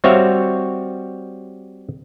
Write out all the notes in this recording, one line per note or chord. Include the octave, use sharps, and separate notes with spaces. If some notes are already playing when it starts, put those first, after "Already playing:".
G3 C4 F#4 C#5 E5 F5